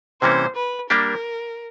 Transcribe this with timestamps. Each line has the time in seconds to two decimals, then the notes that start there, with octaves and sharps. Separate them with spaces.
0.22 C3 E3 G3 A#3 C#4 C5
0.56 B4
0.90 G3 A#3 D4 G4 A#4